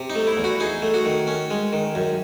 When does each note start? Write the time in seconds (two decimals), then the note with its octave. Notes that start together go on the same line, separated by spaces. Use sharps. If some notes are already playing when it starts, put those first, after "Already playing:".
Already playing: C3
0.10 D#4
0.15 A3
0.27 E4
0.37 E2
0.44 F#4
0.60 D#4 G#4
0.82 A3
0.94 F#4
1.05 D#3
1.27 C#4
1.51 G#3
1.73 D#3
1.95 F#2